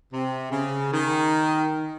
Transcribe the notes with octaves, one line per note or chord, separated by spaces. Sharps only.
C3
C#3
D#3